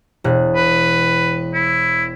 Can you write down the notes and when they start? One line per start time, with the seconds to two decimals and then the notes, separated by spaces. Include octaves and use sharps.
0.24 E1 F#6
0.56 B4
1.54 E4